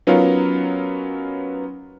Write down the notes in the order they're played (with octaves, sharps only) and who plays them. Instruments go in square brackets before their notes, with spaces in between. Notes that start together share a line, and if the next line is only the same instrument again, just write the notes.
[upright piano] F#3 B3 C#4 D#4 F4 A#4